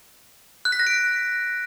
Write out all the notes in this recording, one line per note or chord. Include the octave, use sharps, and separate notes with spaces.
F#6
B6
A#6
D7